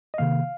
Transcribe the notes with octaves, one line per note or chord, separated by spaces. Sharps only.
D#5
C3 D#3 A#3 F5